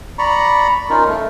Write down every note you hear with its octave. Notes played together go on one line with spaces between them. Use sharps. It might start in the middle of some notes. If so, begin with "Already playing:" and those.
D5 A#5 B5 C#6
C#4 D#4 F4 A#4
A3